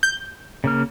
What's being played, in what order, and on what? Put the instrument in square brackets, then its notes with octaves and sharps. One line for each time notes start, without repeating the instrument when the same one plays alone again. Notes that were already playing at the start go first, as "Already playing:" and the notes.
[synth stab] G6
[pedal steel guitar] C#3 A#3 F6